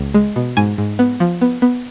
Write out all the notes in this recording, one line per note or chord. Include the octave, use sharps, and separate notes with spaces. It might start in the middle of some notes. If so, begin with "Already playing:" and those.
Already playing: C#2
G#3
B2
G#2 G#5
G#2
B3
F3
B3
B3